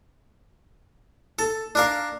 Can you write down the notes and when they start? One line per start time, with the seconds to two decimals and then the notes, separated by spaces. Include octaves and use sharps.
1.39 A4
1.75 D4 A#4 F5